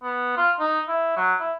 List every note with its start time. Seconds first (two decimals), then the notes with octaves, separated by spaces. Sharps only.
0.03 B3
0.37 F4
0.59 D#4
0.88 E4
1.17 F#3
1.40 E4